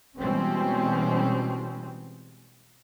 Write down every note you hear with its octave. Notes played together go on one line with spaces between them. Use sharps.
B2 E3 G3 G#3 C4 C#4